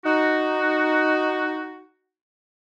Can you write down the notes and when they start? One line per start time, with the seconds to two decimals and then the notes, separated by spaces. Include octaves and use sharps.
0.06 D#4 F#4